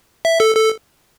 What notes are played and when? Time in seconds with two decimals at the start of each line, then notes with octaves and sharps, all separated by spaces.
0.25 E5
0.40 A4
0.56 A4